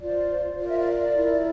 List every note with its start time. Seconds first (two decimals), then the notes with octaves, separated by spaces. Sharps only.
0.01 F4 C5 D5
0.58 F4 A#4 D5
0.68 E5
0.79 D5
1.14 E4 A#4